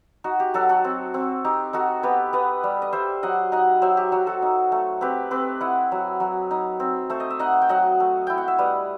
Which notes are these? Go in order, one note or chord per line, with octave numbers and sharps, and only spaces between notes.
D#4 F#4
G4
F#3 F#4 A4
F#4 A4
C4
C4
D#4 G4
D#4 F#4 A4
B3 G4 B4
B3 B4 D#5
G3
D#5
G3 C5 E5
F#3 D#5 F#5
D#4 D#5 F#5
F#3 C5 E5
G4
F#3 F#4
F#4 A4
D#4
A3
C4 G4 B4
C4 G4 B4
E4 D#5 F#5
F#3
F#3
D#4
C4
A3 C5
D#5
E5
D#4 D#5 F#5
G5
F#3 D#5 F#5
A3
E4 G5
F#5
E5
G3 B4 D#5